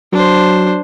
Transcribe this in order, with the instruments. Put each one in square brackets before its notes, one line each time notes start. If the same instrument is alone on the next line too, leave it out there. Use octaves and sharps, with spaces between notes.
[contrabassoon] F#3 [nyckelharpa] D4 C5